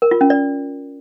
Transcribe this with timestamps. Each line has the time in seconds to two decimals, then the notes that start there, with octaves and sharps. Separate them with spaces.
0.02 A#4
0.11 F4
0.21 C#4
0.30 D5